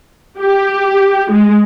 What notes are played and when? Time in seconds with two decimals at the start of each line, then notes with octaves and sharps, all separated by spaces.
0.39 G4
1.30 G#3